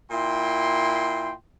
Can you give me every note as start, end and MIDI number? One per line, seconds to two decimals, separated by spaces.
0.11 1.33 46
0.11 1.33 64
0.11 1.33 79
0.11 1.33 84